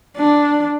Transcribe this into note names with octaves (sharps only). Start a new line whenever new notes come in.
D4